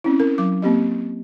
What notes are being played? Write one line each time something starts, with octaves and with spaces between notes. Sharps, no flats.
C4 C#4 E4
A#4
F#3 D6
A#3 C4 G4 D#5